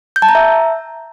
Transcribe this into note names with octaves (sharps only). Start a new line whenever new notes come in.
G6
A5
A#5
E5